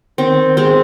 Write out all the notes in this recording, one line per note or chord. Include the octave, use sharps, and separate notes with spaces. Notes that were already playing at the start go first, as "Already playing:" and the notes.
D#3 C4
G#3 C4